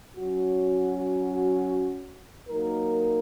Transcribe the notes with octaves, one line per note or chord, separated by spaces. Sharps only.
F#3 C#4 F#4
F#3 A#3 D#4 A#4